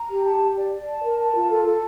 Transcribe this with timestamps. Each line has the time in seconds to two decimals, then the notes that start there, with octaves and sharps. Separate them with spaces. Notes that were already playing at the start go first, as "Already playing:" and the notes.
Already playing: A#5
0.10 G4
0.25 A5
0.41 G4
0.56 D5
0.73 D5
0.88 A5
1.03 A#4
1.19 A5
1.35 F4
1.50 A4
1.65 A4